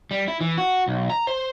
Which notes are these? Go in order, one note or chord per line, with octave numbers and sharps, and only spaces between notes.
G3
E4
E3
F#4
B1
A#5
C5